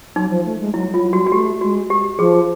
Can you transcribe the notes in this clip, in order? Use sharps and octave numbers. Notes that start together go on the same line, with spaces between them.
F#3 D#4
F3
A3
G#3
F#3 E4
F#3 F4
G3 F#4
F#4
A3 G4
G#3 F#4
G4
F3 G#4